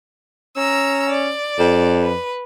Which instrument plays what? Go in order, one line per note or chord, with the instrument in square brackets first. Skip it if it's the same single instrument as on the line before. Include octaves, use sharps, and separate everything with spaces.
[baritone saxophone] C#4 [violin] A#5 E6
[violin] D5
[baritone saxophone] F2
[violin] B4